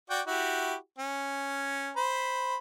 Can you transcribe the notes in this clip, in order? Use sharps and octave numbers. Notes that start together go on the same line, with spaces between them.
F#4 D5 G5
E4 F#4 G4
C#4
C5 B5